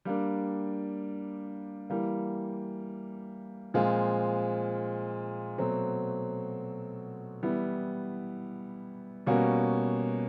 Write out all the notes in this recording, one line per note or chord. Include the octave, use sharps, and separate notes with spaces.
G3 A#3 D4
E3 G3 A#3
A#2 F3 G#3 C4 F4
B2 F#3 A3 C4
E3 G3 B3 E4
B2 G3 A#3 C#4 F#4